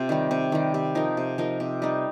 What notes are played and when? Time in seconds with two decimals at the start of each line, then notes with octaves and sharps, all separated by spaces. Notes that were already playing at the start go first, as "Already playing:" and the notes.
Already playing: C3 C4 F4 C5
0.09 D#3 G3
0.31 C3
0.52 D#3 G3
0.74 C3
0.95 F3 D#4 A#4
1.17 C3
1.38 F3 D#4 A#4
1.60 C3
1.82 G3 D#4